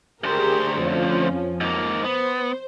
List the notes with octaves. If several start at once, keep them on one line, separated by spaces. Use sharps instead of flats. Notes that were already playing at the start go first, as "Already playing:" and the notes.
D2 G4 G#4 A#4 C5
F2 F3 C#4
G#2 A#3
B3 C5